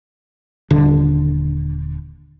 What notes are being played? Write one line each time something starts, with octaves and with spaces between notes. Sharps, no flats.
D#1 D3